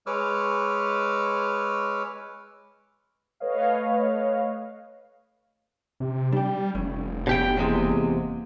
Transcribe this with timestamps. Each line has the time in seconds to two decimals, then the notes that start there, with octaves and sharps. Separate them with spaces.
0.06 G#3 B4 C#5 D6 E6 F6
3.40 A3 B4 C#5 D#5 F5
6.00 C3
6.32 G3 D4 G5
6.75 F1 A3 C#4
7.27 B2 D4 G4 G5
7.57 E2 C3 G#3 A#3